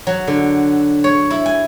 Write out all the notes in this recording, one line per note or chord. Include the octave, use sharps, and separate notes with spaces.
F#3
D3
C#5
E4
G#5